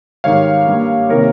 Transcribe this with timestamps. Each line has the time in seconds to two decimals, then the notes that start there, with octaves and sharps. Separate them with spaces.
0.24 G#2 D#3 G3 C#5 F5
0.67 G2 G3 A#3
1.09 C3 D#3 A#3 A#4 C#5